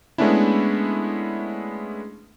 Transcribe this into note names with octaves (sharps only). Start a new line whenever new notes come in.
G#3 A3 B3 C#4 D4 E4